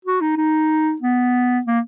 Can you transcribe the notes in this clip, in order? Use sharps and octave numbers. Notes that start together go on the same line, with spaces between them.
F#4
D#4
D#4
B3
A#3